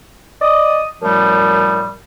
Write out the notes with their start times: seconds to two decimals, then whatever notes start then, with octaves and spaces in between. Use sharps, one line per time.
0.41 D5 D#5 D#6
1.02 F#2 A2 F3 G3 A3